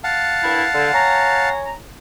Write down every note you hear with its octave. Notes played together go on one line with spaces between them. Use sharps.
F5 F#5 A5
C2 G2 E4
D3
C#5 G#5 A#5